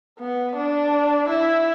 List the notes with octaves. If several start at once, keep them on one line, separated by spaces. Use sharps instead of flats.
B3
D4
E4